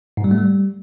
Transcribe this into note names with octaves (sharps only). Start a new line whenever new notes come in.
G#2
G3
A3
G3